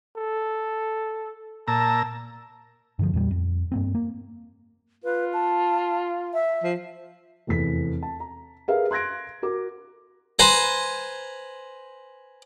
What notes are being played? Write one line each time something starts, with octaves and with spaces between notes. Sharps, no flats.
A4
A#2 A5 A#5 E6
G2 D3 F3
E2 A#2 G3
F2
G2 A#3 C4
A#3
F4 B4
A5
E5
F3
F1 E2 B6
A5
A#5
G4 G#4 A#4 B4 E5 F5
C6 F#6 G#6 A#6 D7
F#4 A#4 D6
B4 C5 G#5 A#5